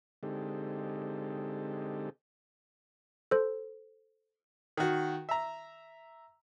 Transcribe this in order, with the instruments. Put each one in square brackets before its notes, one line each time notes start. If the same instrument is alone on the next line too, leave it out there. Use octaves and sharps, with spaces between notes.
[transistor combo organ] D3 G#3 C4 D#4 G4 A4
[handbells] A4 C5
[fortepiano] D#3 F#4
E5 A#5